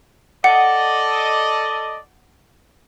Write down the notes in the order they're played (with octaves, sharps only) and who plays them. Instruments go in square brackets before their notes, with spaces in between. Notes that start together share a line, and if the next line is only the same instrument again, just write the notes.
[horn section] A4 D5 D#5 [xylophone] F#5